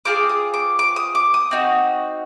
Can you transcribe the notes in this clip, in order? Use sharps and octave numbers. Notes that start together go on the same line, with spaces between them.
C4 F4 G#4 D6
D#6
D6
D6
D#6
D6
D#6
C4 D#4 F#4